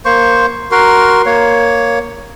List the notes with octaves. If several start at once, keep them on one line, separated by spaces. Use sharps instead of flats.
A#3 C5 C#6
F#4 A#4 C6
A#3 C#5